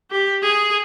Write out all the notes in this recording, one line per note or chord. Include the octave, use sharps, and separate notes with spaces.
G4
G#4